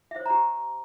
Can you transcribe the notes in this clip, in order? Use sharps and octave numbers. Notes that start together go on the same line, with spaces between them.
G4 C5 C#5 E5 A#5